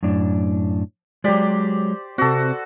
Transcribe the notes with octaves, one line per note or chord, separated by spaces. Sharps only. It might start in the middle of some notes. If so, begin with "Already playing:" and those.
F#2 A2 D4
F#3 G#3 G4 C5 D5
C3 C4 F#4 A4